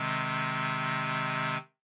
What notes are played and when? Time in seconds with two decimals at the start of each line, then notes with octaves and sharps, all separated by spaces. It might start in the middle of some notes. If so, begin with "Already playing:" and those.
Already playing: C3 D#3 G#3 C4